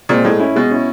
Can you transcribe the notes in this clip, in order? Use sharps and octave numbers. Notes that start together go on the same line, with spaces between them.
A#2 G#3 C4
A2 G#3
C#4 E4
B2 G#3
C#4 E4